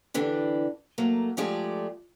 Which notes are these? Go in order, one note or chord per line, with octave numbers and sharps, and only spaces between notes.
D3 E3 D4 G4
F#3 A3 A#3
F3 G#3 A3 G4 G#4 D5